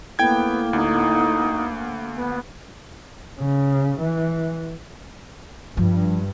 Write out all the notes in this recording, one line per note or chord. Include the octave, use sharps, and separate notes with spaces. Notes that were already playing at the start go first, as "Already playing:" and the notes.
A2 A#3 B3 G5 G#6
D2 D#4
B3
C#3
E3
G2 F3